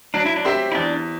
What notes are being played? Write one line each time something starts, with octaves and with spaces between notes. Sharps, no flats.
F#3 D4
E4
D4
C4 G4 C5 E5
E4
E2 D4